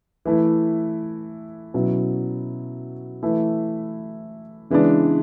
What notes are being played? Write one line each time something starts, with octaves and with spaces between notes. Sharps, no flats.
E3 A3 E4
B2 F#3 C#4 E4
E3 A3 E4
C#3 E3 G#3 B3 D4